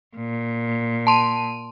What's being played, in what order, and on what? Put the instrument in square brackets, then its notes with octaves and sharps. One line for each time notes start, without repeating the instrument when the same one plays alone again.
[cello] A#2
[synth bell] A5 C6 D#7